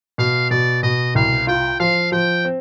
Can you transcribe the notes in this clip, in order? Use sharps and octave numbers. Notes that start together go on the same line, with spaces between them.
B2 F5
B2 D5
B2 D#5
C2 F5
F4 G5
F3 F5
F3 G5
C4